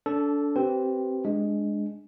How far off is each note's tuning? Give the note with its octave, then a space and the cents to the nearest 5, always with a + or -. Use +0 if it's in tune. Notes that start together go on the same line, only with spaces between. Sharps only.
D4 -30 A4 +0
C4 +0 G4 -30 B4 +0
G#3 +0 D4 +0